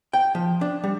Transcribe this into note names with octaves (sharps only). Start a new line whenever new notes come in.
G5
F3
D4
G3